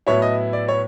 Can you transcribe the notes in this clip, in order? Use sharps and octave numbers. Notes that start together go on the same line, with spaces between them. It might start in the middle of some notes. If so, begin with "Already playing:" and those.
A2 F#3 B3 E4 C#5
D#5
D5
C#5